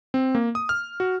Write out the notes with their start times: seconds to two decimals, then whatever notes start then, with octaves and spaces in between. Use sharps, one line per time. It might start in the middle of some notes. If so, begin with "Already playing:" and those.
0.14 C4
0.35 A#3
0.55 D#6
0.69 F6
1.00 F#4